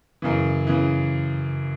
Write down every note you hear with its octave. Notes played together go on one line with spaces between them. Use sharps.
F#2 C#3 E3
C#3 E3